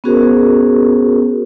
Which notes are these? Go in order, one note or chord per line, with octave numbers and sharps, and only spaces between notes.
B3 C#4 F#4 G#4 A#4 C5